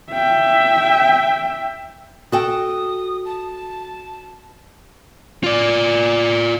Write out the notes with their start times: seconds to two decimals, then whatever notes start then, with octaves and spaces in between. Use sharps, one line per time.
0.11 E5 G5
2.32 F#4 A4 G5 D#6
3.26 A5
5.44 F4 D5